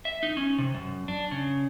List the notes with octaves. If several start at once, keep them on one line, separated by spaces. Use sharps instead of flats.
E5
D#4
C#4
C3
F#2
D4
C#3